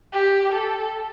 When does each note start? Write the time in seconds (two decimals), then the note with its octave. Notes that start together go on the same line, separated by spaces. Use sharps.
0.13 G4
0.52 A4